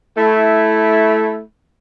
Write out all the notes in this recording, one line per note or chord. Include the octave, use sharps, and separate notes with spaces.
A3 E4